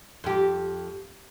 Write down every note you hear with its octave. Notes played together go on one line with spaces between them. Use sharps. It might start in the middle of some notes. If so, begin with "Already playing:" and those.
F2 G4